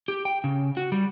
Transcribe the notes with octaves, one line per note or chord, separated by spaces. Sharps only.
G4
G5
C#3
F#4
G3